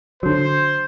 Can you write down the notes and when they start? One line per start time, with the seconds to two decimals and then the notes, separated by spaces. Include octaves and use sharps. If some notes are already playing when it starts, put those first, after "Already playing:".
0.23 D3 F#3 C5